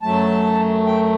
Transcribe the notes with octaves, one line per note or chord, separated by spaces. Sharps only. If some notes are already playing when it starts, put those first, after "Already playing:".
F#2 F#3 A3 A5
G5